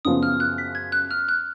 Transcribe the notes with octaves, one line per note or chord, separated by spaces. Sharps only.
F#2 C#3 F3 B3 D#6
F6
F#6
B6
G#6
F#6
F6
F#6